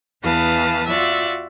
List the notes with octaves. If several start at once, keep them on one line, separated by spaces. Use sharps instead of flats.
E2 E3 B4 F5 A5 D#6
F4 F#4 D5 E5